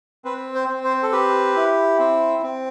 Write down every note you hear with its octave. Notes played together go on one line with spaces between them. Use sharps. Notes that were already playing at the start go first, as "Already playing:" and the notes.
C4 B4
C5
C4
C5
A4
G4 B4
E4
C4
C4